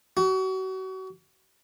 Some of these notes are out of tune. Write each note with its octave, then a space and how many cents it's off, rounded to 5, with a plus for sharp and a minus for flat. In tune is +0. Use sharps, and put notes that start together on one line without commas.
F#4 +35